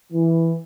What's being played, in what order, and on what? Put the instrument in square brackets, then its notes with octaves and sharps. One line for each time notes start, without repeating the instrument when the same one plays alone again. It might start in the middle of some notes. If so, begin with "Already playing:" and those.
[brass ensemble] E3